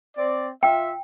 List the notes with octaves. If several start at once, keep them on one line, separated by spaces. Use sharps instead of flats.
C4 D5
F4 E5 G5